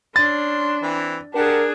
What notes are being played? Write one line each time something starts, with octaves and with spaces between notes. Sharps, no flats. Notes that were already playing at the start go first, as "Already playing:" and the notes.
C#4 D4 C6 A6
E3 C4
D4 G4 G#4 A#4 F#5 A5